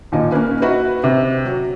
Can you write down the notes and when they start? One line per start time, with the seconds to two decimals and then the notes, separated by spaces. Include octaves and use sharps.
0.12 D#2 A#2 D#4
0.32 A#3 C#4 B4
0.62 D#4 E4 F#4 B4 E5
1.04 C3
1.46 F#3